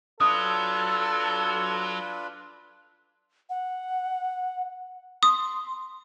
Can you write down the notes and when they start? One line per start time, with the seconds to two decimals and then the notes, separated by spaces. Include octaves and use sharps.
0.20 F#3 D4 F4 A4 B4 D#6
3.50 F#5
5.23 C6 D#6